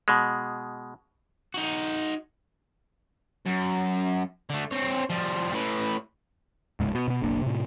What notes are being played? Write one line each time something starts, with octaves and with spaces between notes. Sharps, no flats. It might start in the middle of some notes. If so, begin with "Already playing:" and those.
B2 G#3
D#4 F#4
F#2
D3 A3
C4 C#5
F3 G3
A2 B4
D1 C#2 G#2
B2
B2 B3
F#1 B1 A#3 D4
A2 C3